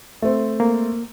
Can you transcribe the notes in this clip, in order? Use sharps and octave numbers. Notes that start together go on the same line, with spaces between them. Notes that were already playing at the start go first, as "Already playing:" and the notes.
A3 C4
A#3